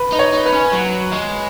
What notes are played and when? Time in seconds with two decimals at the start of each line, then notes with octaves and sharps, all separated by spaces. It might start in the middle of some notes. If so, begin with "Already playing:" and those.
Already playing: B4
0.13 D#4
0.19 C#5
0.33 D#4
0.46 B4
0.53 C#4
0.72 F#3
1.12 G#3